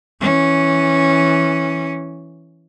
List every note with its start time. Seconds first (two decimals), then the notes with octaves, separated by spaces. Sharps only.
0.21 E3 C#4